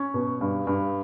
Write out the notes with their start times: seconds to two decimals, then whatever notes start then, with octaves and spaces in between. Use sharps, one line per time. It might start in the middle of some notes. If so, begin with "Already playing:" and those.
Already playing: C#4
0.14 B2
0.41 G2
0.67 G2